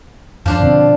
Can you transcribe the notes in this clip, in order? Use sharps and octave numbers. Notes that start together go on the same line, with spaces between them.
F#2 F3 D4 C5
B2 D3 C4